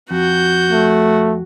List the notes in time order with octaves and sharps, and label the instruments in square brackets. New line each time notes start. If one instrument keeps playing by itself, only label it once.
[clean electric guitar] F2 [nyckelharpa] F#4 [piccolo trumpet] G6
[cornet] A3